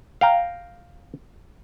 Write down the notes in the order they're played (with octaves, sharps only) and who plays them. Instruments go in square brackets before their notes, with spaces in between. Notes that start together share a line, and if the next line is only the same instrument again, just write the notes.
[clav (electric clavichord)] F5 G5 A#5